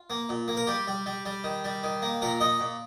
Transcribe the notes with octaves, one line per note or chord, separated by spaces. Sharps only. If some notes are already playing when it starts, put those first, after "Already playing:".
Already playing: F4
A#3
A#2
A#3
A#4
G3 G4
G3
G3
G3
D#3
G3
D#3
A#3
A#2 A#4
A#2 D#5
A#2